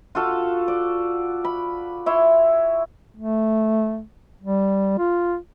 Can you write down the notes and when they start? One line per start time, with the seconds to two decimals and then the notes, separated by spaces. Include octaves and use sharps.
0.15 F4 F#4 A4 F5
0.68 D5
1.44 B5
2.06 E4 C#5 E5 C6
3.16 A3
4.41 G3
4.99 F4